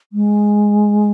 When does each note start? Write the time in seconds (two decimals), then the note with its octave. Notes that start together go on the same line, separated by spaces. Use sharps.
0.13 G#3